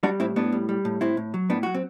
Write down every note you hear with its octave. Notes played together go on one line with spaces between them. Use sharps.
G3 D4 F#4
A2 C4 E4
A2 B3 D4
G3
G3
A2
A2 C4 E4
A2
F#3
A2 B3 D4
F#3 F#4
C4